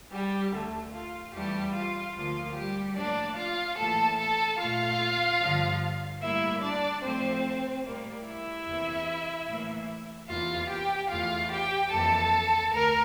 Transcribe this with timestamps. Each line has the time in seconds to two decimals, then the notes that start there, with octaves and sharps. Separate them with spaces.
0.12 G3 G4
0.53 D2 D3 A3
0.93 F4
1.34 E2 E3 G3 A3 G4
1.75 F4
2.15 D2 D3 F3 A#3 F4
2.56 G3 G4
2.97 A2 F3 A#3 D4 D5
3.38 F4 F5
3.78 A2 E3 A#3 A4 A5
4.19 A4 A5
4.60 A#2 A3 F4 F5
5.41 G2 D3 F3
6.22 A2 G3 A#3 E4 E5
6.63 D4 D5
7.04 A2 F3 A3 C4 C5
7.85 A2 G3 A#3
8.25 E4 E5
8.67 E2 C3 E3 A#3
9.48 A2 E3 A#3
10.29 E2 C3 E3 A#3 F4 F5
10.70 G4 G5
11.10 E2 E3 A3 F4 F5
11.51 G4 G5
11.92 F2 E3 A#3 A4 A5
12.73 D2 A#4 A#5